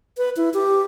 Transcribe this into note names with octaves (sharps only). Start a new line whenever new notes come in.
B4
E4
G4